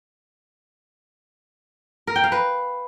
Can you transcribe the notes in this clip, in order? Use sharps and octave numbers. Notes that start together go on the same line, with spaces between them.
A#4
G5
F5
B4